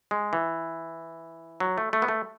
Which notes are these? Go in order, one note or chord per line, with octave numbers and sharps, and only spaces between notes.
G#3
E3
F#3
A3
A3
B3
A3